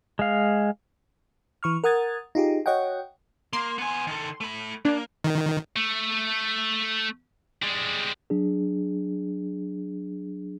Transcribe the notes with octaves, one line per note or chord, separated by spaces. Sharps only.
G#3 F5
E3 C#6 F6
A#4 F#5 D#6 G#6 A6
D#4 F4 G4 G#4
F#4 C#5 D#5 F#5 G5
A#3 C6
B3 G#5
D#3 A4
A3 B5
A#3 D4
D#3
A3
G3 G#3
F#3 D4 G#4